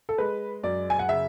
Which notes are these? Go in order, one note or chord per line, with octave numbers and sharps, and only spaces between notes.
A4
G#3 B4
F#2 D5
G#5
F#5
C#3 E5